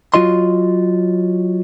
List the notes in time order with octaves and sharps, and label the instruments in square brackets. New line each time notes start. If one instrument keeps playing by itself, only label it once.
[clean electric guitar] F#3 F4 F#4 D#5 C6